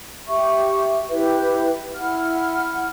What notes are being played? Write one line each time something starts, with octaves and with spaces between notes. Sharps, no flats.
G4 E5 C#6
E4 G4 B4 E5
E4 F#5 F6